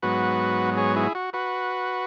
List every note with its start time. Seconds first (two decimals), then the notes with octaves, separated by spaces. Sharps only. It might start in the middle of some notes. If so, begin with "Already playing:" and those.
0.02 G#2 F#3 B3 F#4 B4
0.77 G#4 C#5
0.96 E4 G#4
1.15 F#4
1.33 F#4 B4